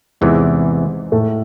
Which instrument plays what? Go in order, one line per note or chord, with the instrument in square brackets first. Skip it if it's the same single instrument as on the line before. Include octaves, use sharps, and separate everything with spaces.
[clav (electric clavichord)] E2 C3 E3 [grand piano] G#2 G#3
[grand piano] A2 A3